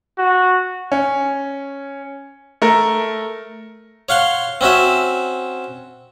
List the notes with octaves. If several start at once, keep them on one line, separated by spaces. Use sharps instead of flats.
F#4
C#4
A3 A#4
C#5 F5 F#5 C6
C4 C#4 F#4 E5